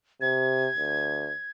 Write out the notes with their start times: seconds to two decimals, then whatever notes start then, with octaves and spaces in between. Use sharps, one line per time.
0.21 C3 G#6
0.77 D2